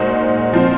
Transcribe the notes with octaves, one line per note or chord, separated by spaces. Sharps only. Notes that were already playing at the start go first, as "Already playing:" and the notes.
Already playing: A#2 G#3 D#4 F#4 C5
F3 C4 F4 C5